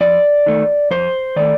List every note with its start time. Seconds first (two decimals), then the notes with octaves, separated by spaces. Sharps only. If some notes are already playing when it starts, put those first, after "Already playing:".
0.01 F2 D5
0.46 D#3 A3
0.91 F2 C5
1.36 D#3 A3 D5